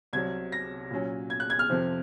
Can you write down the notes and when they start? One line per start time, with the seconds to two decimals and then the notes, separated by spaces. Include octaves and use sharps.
0.13 C2 C3 F#3 G#6
0.52 A#6
0.91 A#2 F#3 C#4
1.30 G#6
1.40 F#6
1.50 G#6
1.59 F6
1.69 F2 C3 F3 C4